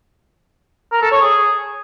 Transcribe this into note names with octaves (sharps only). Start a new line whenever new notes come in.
A#4
A4
C#5
G#4